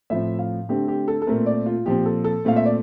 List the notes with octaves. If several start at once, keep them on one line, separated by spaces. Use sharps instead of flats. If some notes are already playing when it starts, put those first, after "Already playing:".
A2 F3 C4 E5
F5
D3 A3 C4 G4
G4
A4
A4
A#2 A3 C4 A#4
D5
F4
A#2 F3 C4 G4
A4
A4
A#2 A3 C4 F5
E5
D5